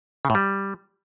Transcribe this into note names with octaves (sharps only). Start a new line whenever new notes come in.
C#3
A2
G3